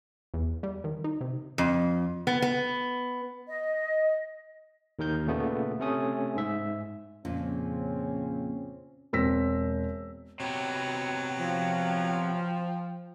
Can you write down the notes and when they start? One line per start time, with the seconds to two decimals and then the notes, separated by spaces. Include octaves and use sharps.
0.34 E2
0.63 G3
0.84 D#3
1.04 D#4
1.21 C3
1.58 F2
2.27 B3
2.42 B3
3.48 D#5
4.99 D#2 D#3 A#4 G6
5.27 A#2 C#3 A3 B3
5.80 C3 A3 C#4 D#6
6.37 G#2 E5
7.25 F2 A#2 C#3 C4 C#4
9.13 E1 C4 E6 A#6 B6
10.40 C3 F#3 B3 G5
11.39 F3